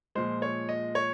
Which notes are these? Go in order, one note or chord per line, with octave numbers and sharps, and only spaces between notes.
A#2 F3 G#3 C5
C#5
D#5
C#5